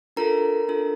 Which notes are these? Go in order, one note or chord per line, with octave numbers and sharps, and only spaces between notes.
D4 F4 A4 A#4 A#5
D4 F4 A4